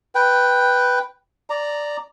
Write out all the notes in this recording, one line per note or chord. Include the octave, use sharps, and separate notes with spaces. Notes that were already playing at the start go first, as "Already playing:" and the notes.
B4 G5
D5 A#5